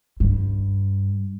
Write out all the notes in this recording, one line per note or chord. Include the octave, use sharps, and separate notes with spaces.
G2